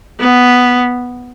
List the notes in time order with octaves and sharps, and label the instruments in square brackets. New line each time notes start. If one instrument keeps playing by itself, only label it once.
[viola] B3